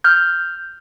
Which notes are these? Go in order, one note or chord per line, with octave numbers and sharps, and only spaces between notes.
F6 G6